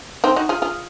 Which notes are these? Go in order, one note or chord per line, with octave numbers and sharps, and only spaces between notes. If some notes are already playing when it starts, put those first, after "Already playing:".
C4 D#4
D#4 F#4
F4 G#4
F4 G#4